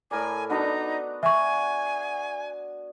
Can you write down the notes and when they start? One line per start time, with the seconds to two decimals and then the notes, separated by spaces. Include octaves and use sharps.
0.11 A2 A#4 D5 G#5
0.50 B3 D4 D#4 F#4
1.23 E5 G#5 C#6